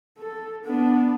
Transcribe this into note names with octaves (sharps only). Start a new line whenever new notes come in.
A4
B3 D4